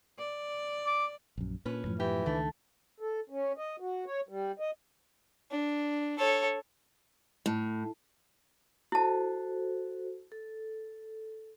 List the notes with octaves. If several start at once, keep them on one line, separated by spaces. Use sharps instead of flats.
D5
D6
A#1 F#2
A#2 C#4 B4
F#2 A2 F3
E3 G4
C#2 D#3 A3 D4
A4
C#4
D#5
F#4
C#5
G3
D#5
D4
A4 C#5
A2
E4 F#4 A4 C5 A5
A4